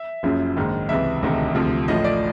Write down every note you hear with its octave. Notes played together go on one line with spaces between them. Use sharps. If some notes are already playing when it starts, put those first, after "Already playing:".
Already playing: E5
F#1 F#2 C#3 F3
A#1 G#2 D#3
C#2 C3 E3 E5
E1 D2 C3 D#3
D2 C3 F3
A1 A2 F3 D#5
D5